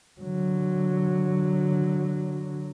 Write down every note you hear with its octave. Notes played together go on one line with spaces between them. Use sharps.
D3 F#3